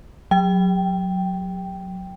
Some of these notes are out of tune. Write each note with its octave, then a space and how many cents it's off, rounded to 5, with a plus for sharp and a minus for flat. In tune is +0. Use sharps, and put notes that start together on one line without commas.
F#3 -5 G5 +0